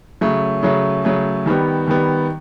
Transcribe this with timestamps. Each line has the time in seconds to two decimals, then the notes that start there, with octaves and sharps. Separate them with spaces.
0.21 C#3 F#3 A3
0.63 C#3 F#3 A3
1.05 C#3 F#3 A3
1.46 D#3 G3 B3
1.88 D#3 G3 B3